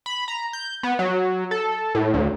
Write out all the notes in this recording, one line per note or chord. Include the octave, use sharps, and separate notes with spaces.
B5
A#5
G6
B3
F#3
A4
A2
D2